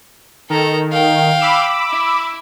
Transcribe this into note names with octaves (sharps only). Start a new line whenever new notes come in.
D#3 A4 A#5
F5 G5
B5 D6 E6
E4